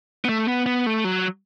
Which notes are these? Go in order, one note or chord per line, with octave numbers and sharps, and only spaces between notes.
B3
A3
B3
B3
A3
F#3